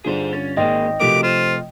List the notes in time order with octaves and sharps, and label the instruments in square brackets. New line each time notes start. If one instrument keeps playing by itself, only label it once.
[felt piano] G2 D3 F4 [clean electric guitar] G#4 C5
[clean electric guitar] C#4 [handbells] A6
[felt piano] G#1 D5 C6 [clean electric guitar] A#3 G#4 [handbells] D#5 G5
[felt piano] C3 F3 A3 [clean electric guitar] F#4 G4 A#4 [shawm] D6
[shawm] F4 [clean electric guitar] C5